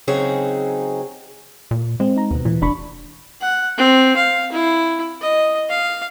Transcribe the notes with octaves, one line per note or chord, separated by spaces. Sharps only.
C#3 F#3 C4 C#4 D#4 G#4
A#2
G#3 C4
D#4 A#5
D#2 B2 B3
A#2 E3
F1 D4 B5 C#6
F#5
C4
F5
E4
D#5
F5